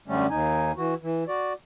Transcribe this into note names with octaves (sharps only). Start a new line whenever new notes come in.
F#2 D3 G3 A3 C#4
D#2 D#4 G#5
E3 F#4
E3
F#4 D5